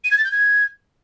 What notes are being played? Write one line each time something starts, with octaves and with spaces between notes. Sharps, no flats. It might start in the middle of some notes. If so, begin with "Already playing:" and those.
D#7
G#6
A6
G6
G#6